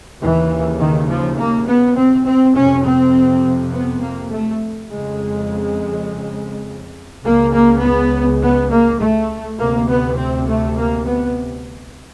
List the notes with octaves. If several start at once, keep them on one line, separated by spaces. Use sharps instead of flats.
D#2 C#3 E3
D#3
F3
A#3
B3
C4
C4
F2 C3 C#4
C4
B3
A#3
A3
F2 C#3 G#3
C#2 C#3 A#3
A#3
B3
B3
A#3
A3
D2 C3 A#3
B3
C4
A3
A#3
B3